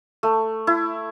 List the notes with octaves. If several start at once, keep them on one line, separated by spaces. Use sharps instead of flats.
A3
E4